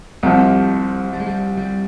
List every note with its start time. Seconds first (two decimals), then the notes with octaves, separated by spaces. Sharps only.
0.23 C2 C3 F3 G3
1.13 G3
1.20 G#3
1.27 G3
1.57 G3